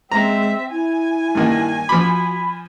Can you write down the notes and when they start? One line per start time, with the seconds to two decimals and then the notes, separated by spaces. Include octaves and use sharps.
0.12 G#3 C4 E5 A#5
0.71 E4 G#5
1.35 G2 D#3 A#3
1.89 F3 F#4 B5 D6